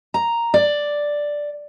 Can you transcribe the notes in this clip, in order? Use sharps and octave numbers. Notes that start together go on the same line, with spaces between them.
A#5
D5